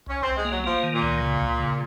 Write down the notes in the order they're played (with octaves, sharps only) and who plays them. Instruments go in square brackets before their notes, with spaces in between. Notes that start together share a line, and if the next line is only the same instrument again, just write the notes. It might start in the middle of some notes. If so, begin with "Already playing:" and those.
[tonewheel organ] C2 [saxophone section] C#4
[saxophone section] C4
[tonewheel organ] C2
[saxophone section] G#3
[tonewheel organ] A#3
[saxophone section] F#3
[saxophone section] F3 [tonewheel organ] A#3
[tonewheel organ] D#3
[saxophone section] A#2
[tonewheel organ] C#2
C#3
C#2
C#3